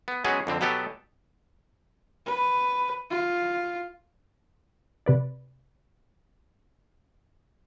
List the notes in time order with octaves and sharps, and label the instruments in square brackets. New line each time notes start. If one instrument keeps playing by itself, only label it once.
[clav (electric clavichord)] B3
F#3 G#3 B3 C#4 F#4 G#4
F2 D3 C4
B2 F#3 B3 G4 A4
[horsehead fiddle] B4
F4
[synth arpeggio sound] C3 B4 D5